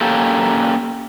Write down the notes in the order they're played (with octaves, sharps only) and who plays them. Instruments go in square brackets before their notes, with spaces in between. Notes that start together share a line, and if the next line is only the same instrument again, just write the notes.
[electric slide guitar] A#3 C#4 G4 A4